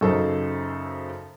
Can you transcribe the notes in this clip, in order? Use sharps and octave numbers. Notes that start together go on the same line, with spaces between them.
F#2 C#3 D#4 A4 C5